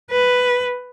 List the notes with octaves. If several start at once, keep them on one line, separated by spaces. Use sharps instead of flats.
B4